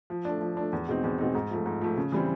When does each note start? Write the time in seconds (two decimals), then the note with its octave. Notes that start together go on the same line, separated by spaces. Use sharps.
0.10 F3
0.25 A3 D4
0.41 F3
0.57 A3 D4
0.73 E2
0.88 B2 G#3 C4 D#4
1.04 E2
1.18 B2 G#3 C4 D#4
1.35 G#2
1.51 F3 A3
1.66 G#2
1.81 F3 A3
1.97 C#3
2.12 E3 G3 C4